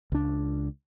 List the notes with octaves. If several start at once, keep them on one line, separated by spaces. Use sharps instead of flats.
C#2 D4